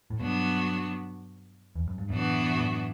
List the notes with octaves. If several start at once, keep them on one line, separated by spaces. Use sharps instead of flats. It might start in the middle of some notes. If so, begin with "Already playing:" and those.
A2
G2 B2 F#3 B3 D4 F#4
E2
F#2
G2
F#2 A2 E3 B3 D4 F#4
F#2 A2